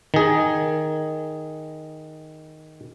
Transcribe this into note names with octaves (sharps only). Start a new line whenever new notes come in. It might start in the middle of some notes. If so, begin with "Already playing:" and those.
D#3 G#4